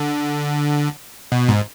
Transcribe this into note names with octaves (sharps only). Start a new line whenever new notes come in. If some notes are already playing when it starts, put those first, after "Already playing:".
Already playing: D3
B2
G#2